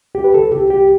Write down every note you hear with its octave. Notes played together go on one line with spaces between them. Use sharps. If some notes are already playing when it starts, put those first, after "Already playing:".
C2 G4
B4
C2 A4
C2 G4
C2 G4